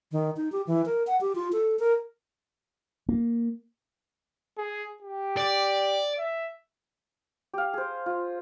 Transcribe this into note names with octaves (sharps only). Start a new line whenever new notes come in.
D#3
D#4
G4
E3
A#4
F#5
G4
F4
A4
A#4
A#3
G#4
G4
D5
E5
G4 F5
G#4 C5
F4